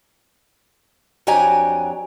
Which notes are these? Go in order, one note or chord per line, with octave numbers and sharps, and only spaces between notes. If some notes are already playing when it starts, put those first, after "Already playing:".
F2 F#3 D4 G4 G#5 A#5